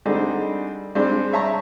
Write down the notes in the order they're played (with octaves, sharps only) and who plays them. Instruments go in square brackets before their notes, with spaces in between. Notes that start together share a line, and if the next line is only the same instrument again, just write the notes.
[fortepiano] D3 G3 C4 D#4 G#4
G3 G#3 C4 D4
C#5 E5 A5 A#5 C#6